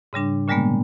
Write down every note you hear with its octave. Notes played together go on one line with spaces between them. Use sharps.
G#2 C#3 G3 D4
A#2 D3 G3 G#3 A#3 B3